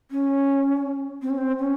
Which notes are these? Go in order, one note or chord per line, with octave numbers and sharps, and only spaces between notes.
C#4
C4
C#4
C4
C#4